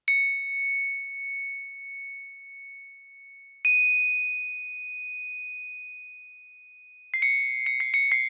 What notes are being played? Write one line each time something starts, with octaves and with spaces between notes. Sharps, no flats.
C#7
D#7
C7
C#7
C#7
C7
C#7
C7